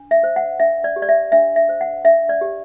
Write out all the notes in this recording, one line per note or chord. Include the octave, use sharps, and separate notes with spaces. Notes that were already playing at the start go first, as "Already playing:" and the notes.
Already playing: D4
E5
C5
F#5
D4 E5
D5
G4
D5
E5
D4 E5
E5
C5
F#5
D4 E5
D5
G4